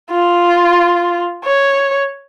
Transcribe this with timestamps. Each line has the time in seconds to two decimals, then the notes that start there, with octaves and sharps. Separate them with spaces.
0.11 F4
1.44 C#5